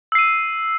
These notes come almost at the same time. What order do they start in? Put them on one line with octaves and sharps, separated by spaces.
E6 C7 D#7